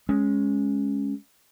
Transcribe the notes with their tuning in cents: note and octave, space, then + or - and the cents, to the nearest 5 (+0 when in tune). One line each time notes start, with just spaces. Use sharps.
G#3 +0 C#4 +0